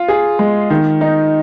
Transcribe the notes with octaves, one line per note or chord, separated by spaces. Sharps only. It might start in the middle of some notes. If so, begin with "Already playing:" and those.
Already playing: F4
G#4
G#3
D#3
D#4